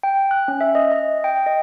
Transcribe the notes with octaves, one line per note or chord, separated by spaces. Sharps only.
G5
F#6
C#4
E5
D#5
D#5
G5
D#5